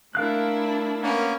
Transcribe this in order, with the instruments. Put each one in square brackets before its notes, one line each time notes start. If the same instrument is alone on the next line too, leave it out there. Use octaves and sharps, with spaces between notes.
[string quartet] A3 D4 E4 [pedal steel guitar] A#4 F5 F#6
[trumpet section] A#3 B3 C#4